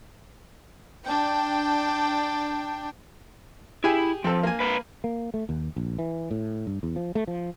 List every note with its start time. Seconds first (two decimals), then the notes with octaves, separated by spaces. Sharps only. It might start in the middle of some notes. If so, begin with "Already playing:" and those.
1.04 D4 G5
3.84 E4 G4 G#4 G#5
4.24 F3 C4 A4
4.43 A#3 G#5
4.60 B4 F5 A#5
5.04 A#3
5.34 A3
5.49 D#2
5.76 A#1
5.99 E3
6.31 A2
6.67 G2
6.83 E2
6.96 F3
7.15 A3
7.27 F3